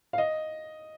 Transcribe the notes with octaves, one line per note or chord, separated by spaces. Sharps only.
F5
D#5